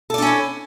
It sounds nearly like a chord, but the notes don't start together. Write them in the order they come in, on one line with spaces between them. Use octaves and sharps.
A4 D5 D4 C#4 E4